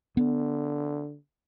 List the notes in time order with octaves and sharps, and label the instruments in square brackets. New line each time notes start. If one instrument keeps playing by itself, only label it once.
[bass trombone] D3 [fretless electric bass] B3